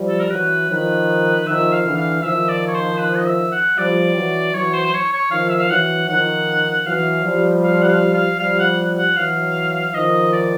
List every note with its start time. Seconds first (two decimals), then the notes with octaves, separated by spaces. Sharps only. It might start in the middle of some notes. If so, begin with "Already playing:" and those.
Already playing: F3 G3
0.09 A4
0.20 A#4
0.31 E3 F#3 B4
0.69 D#3 F3 B4
1.46 D#3 F3 E5
1.72 F5
1.85 D3 E3
1.98 F5
2.23 D#3 F3 E5
2.49 D5
2.67 C#5
2.75 C5
3.00 B4
3.17 D#5
3.27 E5
3.52 F#5
3.78 F3 G3 D5
4.16 E3 F#3
4.54 E3 F#3 C#5
4.74 C5
4.85 C5
4.94 C#5
5.13 C#5
5.31 D#3 F3 F5
5.49 E5
5.60 F5
5.70 E3 F#3 F#5
6.09 D#3 F3 F#5
6.86 E3 F#3 F5
7.24 F3 G3
7.63 F5
7.83 F#5
7.88 F5
8.14 F5
8.39 F3 G3 F5
8.60 F#5
8.98 F#5
9.17 E3 F#3 F5
9.94 D#3 F3 D#5
10.33 D5